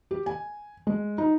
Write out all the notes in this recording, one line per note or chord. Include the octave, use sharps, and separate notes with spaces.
G4
G#5
G#3
D#4